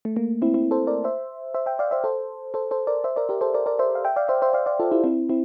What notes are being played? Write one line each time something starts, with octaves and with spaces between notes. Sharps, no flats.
A3
A#3
C4 E4
C4 E4
A4 C5
A#4 D5
C5 E5
C5 E5
E5 G5
D5 F5
C5 E5
A4 C5
A4 C5
A4 C5
A#4 D5
C5 E5
A#4 D5
G4 A#4
A4 C5
A#4 D5
A#4 D5
C5 E5
F5
E5 G5
D5 F5
C5 E5
C5 E5
D5 F5
D5 F5
F4 A4
E4 G4
C4 E4
C4 E4